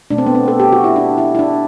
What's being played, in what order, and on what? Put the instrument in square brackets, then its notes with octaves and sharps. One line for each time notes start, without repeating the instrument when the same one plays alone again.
[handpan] B2 A3 D4
C4
B3
C4
A4
G4
F#4
E4
D4
E4
E4
D4